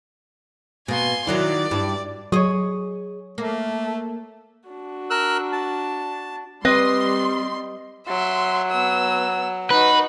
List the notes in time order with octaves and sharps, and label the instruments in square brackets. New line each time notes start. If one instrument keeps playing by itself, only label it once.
[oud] B2 A#3 [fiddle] G#5 C6
[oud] D#3 F#3 E4 [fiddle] D5
[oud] G2 E4
[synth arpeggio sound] F#3 [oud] G#4 D#5 [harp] C#5 D#6
[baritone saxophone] A3 [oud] A#3
[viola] D4 F#4
[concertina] A#4 E6 F#6
A5
[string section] G3 C6 [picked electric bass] C4 [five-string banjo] B4 [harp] D#5
[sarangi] F#3 [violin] E5 C6
[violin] B3 E6
[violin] D#4 F#4 [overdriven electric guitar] B4